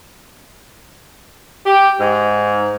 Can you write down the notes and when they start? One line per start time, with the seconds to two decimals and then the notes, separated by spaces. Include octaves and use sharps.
1.65 G4
2.00 G#2